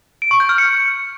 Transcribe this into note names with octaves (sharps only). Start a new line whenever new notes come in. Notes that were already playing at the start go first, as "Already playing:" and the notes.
D7
C#6
G6
F6
C#7